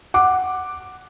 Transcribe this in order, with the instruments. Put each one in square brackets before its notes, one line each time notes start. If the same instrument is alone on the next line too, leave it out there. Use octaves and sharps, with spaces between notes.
[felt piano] F#5 D6